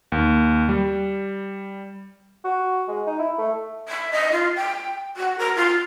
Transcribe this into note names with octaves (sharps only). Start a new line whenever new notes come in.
D#2
G3
F#4
G#3
D#4
E4
A3
E5
D#5
F4
G5
F#4
A#4
F4